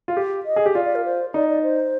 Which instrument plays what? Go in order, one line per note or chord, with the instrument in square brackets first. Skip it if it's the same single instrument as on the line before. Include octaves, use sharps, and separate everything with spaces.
[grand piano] F4
G4
[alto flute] D#5
[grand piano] G#4
G4
[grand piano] F4 [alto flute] D5
[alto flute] D5
A#4
C5
[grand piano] D#4 [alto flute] D5
[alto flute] D5
C5